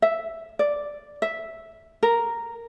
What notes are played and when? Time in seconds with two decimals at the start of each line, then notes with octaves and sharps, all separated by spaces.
0.02 E5
0.59 D5
1.22 E5
2.03 A#4